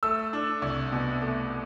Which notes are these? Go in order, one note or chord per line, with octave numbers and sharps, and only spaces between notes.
A3 E6
D4
C2
B2
A3